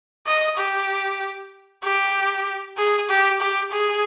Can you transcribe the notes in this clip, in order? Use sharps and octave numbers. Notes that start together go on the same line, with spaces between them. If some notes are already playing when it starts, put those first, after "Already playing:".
D#5
G4
G4
G#4
G4
G4
G#4